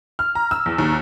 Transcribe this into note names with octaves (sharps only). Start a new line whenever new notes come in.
F6
A#5
E6
E2
D#2